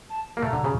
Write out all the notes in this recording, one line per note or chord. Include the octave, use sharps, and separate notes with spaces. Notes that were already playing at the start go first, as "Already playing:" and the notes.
A5
A#3
A3 A#5
D3
C#3